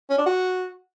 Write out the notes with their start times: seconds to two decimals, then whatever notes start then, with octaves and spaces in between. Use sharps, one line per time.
0.10 C#4
0.18 D4
0.26 F#4